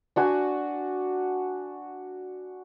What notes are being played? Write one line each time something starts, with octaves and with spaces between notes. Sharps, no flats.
D4 F#4 G#5